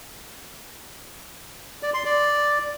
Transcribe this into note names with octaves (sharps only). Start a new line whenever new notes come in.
D5
C6
D5